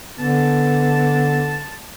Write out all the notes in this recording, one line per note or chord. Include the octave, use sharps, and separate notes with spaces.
D3 B3 A5